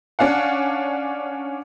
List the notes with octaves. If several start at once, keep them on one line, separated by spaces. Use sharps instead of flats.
C#4 D4 F5 F#5